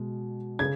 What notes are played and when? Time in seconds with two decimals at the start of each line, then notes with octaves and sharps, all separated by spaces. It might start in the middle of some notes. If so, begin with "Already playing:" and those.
Already playing: B2 G#3
0.59 C#3 G#6